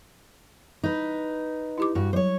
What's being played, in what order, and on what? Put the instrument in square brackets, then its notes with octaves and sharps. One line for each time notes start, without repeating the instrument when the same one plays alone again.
[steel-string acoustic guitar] D#4 B4
[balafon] E4 G4 D6
[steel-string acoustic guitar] G2 F#4
[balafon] F#3 [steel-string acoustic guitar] C5 C#5